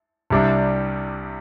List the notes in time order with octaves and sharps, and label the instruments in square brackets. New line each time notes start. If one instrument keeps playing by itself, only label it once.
[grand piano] C2 C3 G3 D4